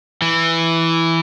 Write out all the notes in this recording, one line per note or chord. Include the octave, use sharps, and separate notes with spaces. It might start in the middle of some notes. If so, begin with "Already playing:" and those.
E3